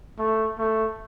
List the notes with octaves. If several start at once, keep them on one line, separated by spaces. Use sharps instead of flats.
A3
A3